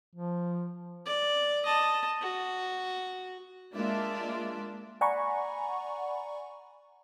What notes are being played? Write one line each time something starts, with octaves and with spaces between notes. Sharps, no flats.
F3
D5
D#5 A5
F#4
G#3 A#3 D4 F4 D5 E5
D5 F#5 G#5 A#5 B5 C#6